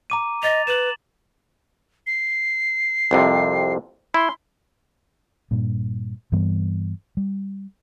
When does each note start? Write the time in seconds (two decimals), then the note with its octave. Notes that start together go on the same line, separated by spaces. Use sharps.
0.10 A#5 D6 D#7
0.43 D#5 A6 F7
0.67 B4 E7 F#7
2.07 C7
3.11 C2 F2 C3
4.14 E4 C6
5.51 G2 A#2
6.32 G2 E3 G3 B3
7.17 G3